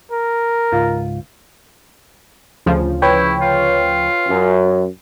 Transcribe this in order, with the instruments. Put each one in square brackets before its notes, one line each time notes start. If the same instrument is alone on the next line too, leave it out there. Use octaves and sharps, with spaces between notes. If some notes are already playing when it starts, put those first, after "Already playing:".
[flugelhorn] A#4
[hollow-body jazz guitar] C#2 G#2 F4
[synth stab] D2 C#3 F3
[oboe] E4 [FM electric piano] B4 C#5 G5
[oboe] F4
[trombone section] F#2